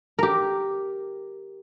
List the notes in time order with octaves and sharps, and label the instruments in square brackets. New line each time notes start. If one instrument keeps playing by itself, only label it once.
[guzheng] G4 A#4